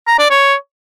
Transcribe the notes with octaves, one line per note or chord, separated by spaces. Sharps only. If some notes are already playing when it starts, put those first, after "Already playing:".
A#5
D5
C#5